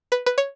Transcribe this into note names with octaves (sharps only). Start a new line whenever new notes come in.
B4
B4
C#5